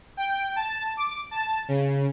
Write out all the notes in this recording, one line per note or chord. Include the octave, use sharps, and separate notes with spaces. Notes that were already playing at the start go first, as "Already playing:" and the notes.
G5
A5
D6
A5
C#3